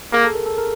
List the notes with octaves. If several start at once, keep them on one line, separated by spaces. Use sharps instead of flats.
A#3 G#4
A4
A#4
A4
A#4